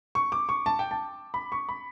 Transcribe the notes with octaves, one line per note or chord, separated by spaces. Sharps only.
C#6
D6
C#6
A5
G5
A5
B5
C#6
B5